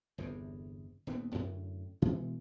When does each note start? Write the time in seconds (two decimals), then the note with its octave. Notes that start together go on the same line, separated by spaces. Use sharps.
0.18 G1 E2 C3
1.07 D#1 D#2 B3 C4
1.33 F#2 A2 D3
2.02 B2 E3 G#3 A3